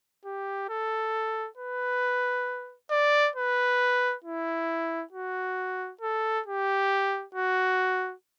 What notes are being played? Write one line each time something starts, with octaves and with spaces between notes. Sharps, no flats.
G4
A4
B4
D5
B4
E4
F#4
A4
G4
F#4